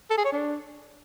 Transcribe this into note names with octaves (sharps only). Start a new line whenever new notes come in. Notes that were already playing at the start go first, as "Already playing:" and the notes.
A4
G#4
C#5
D4